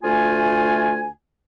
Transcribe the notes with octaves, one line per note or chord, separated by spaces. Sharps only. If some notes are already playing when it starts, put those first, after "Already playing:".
D2 A3 F4 G#5